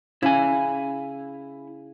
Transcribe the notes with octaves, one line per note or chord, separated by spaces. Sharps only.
C#3 E4 G#5